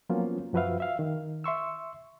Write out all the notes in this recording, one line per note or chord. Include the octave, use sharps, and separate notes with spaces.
F3 F#3 A#3 B3 C#4 F4
F#2 F3 F#4 B4 E5 F5
E5 F5
D#3
E5 C6 C#6 E6